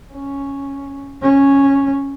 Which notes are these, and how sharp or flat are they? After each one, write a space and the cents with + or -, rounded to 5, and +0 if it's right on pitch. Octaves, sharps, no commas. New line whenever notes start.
C#4 +0
C#4 -5